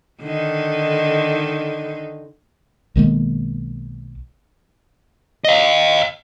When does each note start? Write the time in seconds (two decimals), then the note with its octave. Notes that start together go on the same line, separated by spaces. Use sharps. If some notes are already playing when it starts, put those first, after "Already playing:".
0.23 D3 D#3 D#4
2.96 B1 D#3 G#3 A#3
5.45 D#5 F5